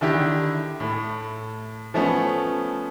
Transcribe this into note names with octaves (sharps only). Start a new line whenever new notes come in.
D3 D#3 E4 G4
A2 A3
F3 A3 B3 C#4